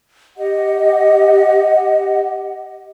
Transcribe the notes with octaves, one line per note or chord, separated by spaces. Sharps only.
G4 D#5 F#5